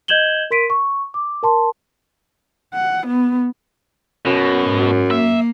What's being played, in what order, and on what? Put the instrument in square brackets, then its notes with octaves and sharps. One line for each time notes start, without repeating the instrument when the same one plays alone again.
[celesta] D#5 G6 G#6 E7 F#7 G7
A#4 C6 B6 D7 D#7
C#6
D6
A#4 A5 C6
[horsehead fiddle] F#5
B3
[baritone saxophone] F#2 [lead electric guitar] B2
[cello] G#2
[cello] A#3 [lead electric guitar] E5